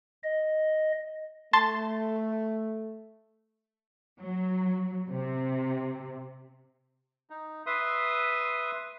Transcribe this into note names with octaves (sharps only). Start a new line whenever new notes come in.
D#5
A3 A5 C6 A6
F#3
C3
D#4
B4 E5 C6 D#6